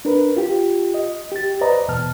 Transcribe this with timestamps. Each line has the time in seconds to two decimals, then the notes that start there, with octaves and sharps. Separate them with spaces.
0.05 D4 A#4 B4
0.36 F4 G4
0.94 D#5
1.32 G4 A6
1.61 B4 C5 D5 D#5 A#5
1.88 E2 B2 A5 F6